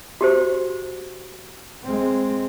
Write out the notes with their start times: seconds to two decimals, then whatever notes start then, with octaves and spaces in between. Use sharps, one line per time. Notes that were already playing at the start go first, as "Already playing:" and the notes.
0.21 F#4 G4 C5
1.83 G#3 C4